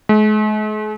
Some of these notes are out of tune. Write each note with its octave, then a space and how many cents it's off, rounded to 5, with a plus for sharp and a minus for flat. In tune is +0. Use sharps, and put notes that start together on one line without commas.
G#3 +45